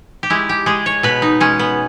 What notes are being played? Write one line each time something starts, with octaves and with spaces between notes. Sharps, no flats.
G4
G#3 E4
G4
G#3 G#4
C#5
B2 B4
D#4
G#3 C#4
B3